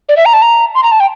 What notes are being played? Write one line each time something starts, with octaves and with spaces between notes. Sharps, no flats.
D5
E5
A#5
A5
A#5
C6
A#5
A5
G5